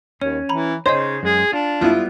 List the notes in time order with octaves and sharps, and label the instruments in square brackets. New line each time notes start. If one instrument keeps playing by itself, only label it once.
[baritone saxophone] D#2 [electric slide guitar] C#4 [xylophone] C#5
[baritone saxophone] E3 [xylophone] A#5 B5
[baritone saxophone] C#3 [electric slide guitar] D#4 G#4 [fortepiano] C5 [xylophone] C#5 D#5
[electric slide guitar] F#2 G#3 [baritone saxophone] G#4
[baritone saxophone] D4 [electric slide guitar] F4
[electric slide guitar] G3 G#3 B3 [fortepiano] E4 F4